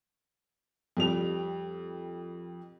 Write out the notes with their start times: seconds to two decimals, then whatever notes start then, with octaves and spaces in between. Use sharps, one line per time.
0.97 F2 G3 F7